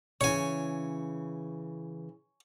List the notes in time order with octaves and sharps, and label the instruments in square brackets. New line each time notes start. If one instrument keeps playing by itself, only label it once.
[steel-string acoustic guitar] C#3 E3 [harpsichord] C#5 G#5